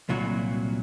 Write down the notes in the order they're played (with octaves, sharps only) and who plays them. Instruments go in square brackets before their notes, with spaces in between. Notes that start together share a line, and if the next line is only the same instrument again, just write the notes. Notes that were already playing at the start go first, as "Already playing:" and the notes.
[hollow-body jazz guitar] C2 A#2 F#3 F#4